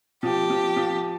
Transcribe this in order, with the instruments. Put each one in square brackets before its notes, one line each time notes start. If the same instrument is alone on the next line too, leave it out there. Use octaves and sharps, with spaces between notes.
[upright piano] F3 [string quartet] G4
[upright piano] F3
F3